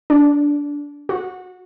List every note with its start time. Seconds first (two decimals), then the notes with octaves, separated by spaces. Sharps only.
0.10 D4
1.09 F#4